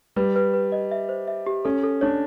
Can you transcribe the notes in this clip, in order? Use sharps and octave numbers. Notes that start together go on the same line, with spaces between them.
G3 B4
B4
B4
D#5
E5
C5
E5
G4
C#4 A4
A4
D4 C#5